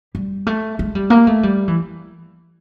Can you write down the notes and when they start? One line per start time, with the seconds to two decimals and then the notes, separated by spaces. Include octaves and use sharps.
0.15 G3
0.47 A3
0.79 G#3
0.95 G3
1.10 A#3
1.27 A3
1.43 G3
1.68 E3